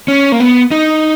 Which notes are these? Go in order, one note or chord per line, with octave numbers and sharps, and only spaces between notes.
C#4
A#3
B3
D#4